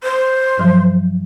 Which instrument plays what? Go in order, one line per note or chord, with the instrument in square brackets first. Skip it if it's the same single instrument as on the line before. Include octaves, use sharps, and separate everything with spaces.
[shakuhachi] C5
[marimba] G2 F3 F#3